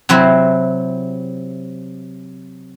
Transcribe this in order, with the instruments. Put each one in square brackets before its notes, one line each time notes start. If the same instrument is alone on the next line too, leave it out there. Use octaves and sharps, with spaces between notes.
[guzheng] C3 F#3 C4 E4 C5